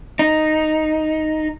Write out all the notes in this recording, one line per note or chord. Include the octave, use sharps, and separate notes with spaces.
D#4